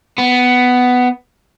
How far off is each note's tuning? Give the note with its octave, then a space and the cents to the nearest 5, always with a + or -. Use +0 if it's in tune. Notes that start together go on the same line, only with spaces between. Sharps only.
B3 +10